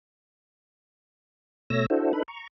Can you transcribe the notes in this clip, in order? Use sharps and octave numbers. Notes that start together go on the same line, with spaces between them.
B2 A3 C#5 E6 A#6
D4 E4 F#4 A4 C5
D4 D#4 A4 B4 B5
A#5 C#6